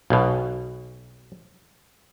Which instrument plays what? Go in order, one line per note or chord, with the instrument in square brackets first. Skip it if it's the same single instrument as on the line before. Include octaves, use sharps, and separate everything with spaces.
[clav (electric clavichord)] B1 B2